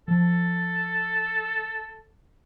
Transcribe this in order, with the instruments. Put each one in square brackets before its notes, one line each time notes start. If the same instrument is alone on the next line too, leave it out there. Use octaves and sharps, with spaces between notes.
[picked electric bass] F3 [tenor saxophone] A4